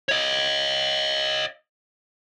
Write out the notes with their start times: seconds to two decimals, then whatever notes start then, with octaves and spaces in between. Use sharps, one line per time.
0.09 C#5 D#5